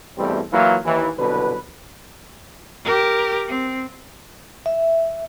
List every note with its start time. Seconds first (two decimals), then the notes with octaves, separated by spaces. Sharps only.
0.18 E2 G2 B2 G3 A3 C4
0.53 E3 F#3 A#3 E4 F4
0.86 D#2 E3
1.18 C2 B2 D3 F#3 B4
2.85 G4 A#4
3.48 C4
4.66 E5